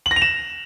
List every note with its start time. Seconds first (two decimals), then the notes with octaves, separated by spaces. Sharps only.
0.06 F#7
0.11 A#6
0.16 F7
0.22 E7